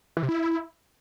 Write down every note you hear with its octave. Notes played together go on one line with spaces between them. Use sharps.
E3
C3
E4